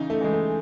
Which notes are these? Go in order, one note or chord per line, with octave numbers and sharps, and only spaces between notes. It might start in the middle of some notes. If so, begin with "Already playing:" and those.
Already playing: C#3 E3 D#4
A3
E3 G#3
A3